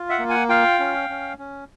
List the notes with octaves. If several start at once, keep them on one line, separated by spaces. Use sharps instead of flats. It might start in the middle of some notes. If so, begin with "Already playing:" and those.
Already playing: F4
E5 F#5
A#3
F#5 G#5
F4 F5 G5
C#4
C#4
C#4